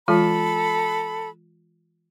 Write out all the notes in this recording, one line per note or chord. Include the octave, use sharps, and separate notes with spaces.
E3 G#3 F4 A4 B5